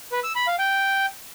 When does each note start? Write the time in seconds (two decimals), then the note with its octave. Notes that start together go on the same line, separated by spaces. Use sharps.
0.12 B4
0.24 E6
0.35 B5
0.47 F5
0.59 G5